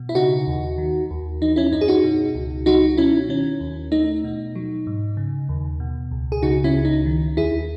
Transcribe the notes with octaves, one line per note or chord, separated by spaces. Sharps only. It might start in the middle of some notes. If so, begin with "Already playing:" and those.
Already playing: B2
E4
C#3 D#4 F#4
D#2
D#3
D#2
E3 D#4
C#4 E4
F#2 D#4
G#4
D#4 F#4
B2
C#2
F#3 D#4 F#4
B2 C#4 E4
D#3 C#4
D#2
A3 D#4
B2
F#3
G#2
C#3
D#2
B2
C#2
G#4
C#3 D#4 F#4
C#4 E4
C#2
D#4
D#3
D#2 E4 G#4